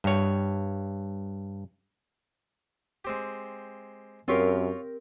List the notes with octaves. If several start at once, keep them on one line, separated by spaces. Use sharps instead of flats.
G2 C#5
G#3 C4 G4
F#2 C4 F4 G4 A#4 C#5 C6